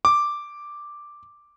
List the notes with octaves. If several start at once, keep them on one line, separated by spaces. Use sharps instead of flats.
D6